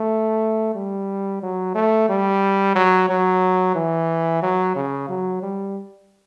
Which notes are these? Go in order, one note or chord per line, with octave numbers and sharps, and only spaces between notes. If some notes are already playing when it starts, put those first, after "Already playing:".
Already playing: A3
G3
F#3
A3
G3
F#3
F#3
E3
F#3
C#3
F#3
G3